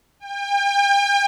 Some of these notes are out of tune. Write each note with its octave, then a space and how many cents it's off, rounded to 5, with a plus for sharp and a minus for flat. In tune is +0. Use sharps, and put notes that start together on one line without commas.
G5 +40